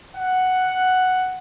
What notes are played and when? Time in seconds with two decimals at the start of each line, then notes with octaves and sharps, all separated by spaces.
0.16 F#5